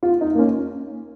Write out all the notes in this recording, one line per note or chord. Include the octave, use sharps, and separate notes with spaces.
F4
D#4
A#3
C#4